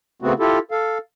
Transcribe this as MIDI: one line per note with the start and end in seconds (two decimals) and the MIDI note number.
0.22 0.33 49
0.22 0.33 57
0.22 0.33 59
0.22 0.33 60
0.22 0.33 66
0.40 0.59 64
0.40 0.59 65
0.40 0.59 67
0.40 0.59 69
0.71 0.98 69
0.71 0.98 77